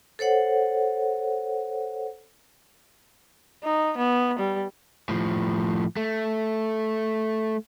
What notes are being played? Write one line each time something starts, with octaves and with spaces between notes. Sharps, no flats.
A4 C5 C#5 F#5
D#4
B3
G3
A2 F3
A3